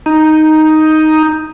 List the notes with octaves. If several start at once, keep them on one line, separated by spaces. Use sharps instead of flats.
D#4